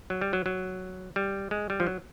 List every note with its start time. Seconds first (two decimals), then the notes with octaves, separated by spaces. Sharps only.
0.10 F#3
0.21 G3
0.33 F#3
0.46 F#3
1.16 G3
1.51 G#3
1.70 G3
1.80 F3
1.87 F#3